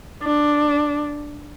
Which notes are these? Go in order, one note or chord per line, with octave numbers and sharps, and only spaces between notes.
D4